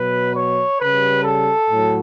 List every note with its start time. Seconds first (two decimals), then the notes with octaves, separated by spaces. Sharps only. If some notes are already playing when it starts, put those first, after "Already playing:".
Already playing: B2 F#3 B4
0.36 C#5
0.80 C#3 G3 B4
1.24 A4
1.68 A2 F#3